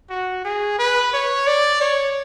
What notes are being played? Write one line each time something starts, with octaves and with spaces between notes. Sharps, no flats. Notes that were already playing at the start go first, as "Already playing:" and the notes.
F#4
G#4
B4
C#5
D5
C#5